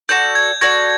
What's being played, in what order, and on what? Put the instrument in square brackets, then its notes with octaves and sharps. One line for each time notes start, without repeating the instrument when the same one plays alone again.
[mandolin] F#4 A4 D5 [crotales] G6
[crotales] G#6
[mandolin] F#4 A4 D5 [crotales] G#6